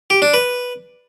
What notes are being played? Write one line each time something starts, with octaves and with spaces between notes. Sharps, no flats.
G4
D4
B4